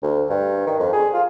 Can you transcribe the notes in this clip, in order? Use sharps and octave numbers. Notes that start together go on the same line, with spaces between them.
D2
G2
D#3
F2
G#4
F4